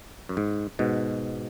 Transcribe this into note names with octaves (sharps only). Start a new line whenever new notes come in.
F#2
G#2
G#2 B2